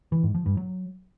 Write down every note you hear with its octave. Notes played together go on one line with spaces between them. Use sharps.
E3
G#2
F3
G2
F#3